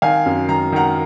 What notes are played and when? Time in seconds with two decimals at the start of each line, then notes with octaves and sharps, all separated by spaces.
0.02 D#3 F5 G#5
0.26 F#2
0.49 D#3 A#5
0.72 D#3 F#5 A#5